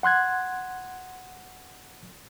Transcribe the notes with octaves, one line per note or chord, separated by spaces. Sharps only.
F#5 C6 F#6 G#6